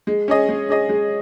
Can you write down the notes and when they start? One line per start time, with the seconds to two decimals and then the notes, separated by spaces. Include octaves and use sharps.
0.07 G#3
0.28 C#4 G#4 D#5
0.49 G#3
0.69 C#4 G#4 D#5
0.89 G#3